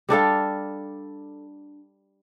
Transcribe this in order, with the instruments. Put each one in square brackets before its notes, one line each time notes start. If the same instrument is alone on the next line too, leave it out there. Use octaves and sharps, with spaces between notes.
[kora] G3 D4 A4 F5